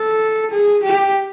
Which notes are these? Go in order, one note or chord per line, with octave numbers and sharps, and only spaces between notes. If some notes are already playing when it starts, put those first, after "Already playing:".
Already playing: A4
G#4
G4